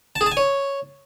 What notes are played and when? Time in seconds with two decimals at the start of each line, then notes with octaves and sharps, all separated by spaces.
0.16 A5
0.21 G#4
0.26 A5
0.32 G#5
0.37 C#5